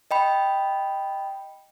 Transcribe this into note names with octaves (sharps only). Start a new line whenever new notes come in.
D#5 G5 B5